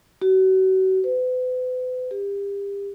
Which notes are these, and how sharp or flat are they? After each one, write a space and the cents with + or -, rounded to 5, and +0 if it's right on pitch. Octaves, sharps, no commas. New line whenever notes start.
F#4 +35
B4 +40
G4 +35